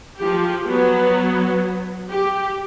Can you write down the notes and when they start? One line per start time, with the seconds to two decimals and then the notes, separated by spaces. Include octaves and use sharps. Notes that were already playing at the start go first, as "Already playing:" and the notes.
0.18 F3 G4
0.67 F#3 B3
2.09 G4